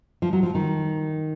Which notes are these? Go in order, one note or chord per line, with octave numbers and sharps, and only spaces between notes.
F3
F#3
F3
D#3